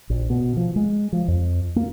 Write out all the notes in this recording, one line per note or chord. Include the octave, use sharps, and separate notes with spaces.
A#1
B2
F3
G#3
F3
F2
A#3